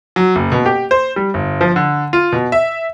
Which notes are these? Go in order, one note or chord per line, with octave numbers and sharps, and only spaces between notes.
F#3
F#1
B2
G4
C5
G3
G1
F3
D3
F4
B2
E5